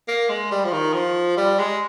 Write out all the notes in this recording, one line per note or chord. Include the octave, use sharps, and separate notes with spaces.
A#3
G#3
G3
F3
D#3
F3
G3
G#3